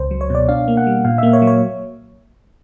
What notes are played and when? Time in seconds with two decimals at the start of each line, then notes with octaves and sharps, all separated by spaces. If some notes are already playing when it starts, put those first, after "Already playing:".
Already playing: C#2 C5
0.11 F#3
0.21 C#5
0.30 B2 D5
0.48 D4 F5
0.68 A#3
0.77 F#5
0.87 G3
1.05 A#2 F5
1.18 A#3 E5
1.33 C#5
1.42 F#3
1.47 C#5